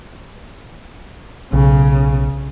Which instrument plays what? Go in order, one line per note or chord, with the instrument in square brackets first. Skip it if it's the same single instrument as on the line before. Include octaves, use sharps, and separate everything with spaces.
[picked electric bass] B1 [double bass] C#3